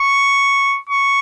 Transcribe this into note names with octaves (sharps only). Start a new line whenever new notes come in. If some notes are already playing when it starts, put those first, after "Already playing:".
Already playing: C#6
C#6